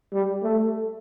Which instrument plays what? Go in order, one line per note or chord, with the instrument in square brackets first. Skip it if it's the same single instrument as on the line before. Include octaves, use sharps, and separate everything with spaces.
[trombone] G3
A3